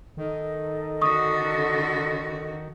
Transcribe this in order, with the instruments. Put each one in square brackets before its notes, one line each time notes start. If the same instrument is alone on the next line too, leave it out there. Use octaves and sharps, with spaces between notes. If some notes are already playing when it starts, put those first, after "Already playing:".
[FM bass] D#3 [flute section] D#4 A4 D#5
[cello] D3 F#4 [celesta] C#6 D#6